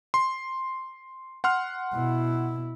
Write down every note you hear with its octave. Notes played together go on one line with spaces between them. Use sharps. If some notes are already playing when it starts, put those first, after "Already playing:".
C6
F#5 C6 F6
B2 E4